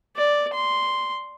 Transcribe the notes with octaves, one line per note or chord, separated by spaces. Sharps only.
D5
C6